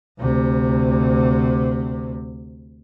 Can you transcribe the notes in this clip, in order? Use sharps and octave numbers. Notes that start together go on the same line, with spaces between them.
D2 C3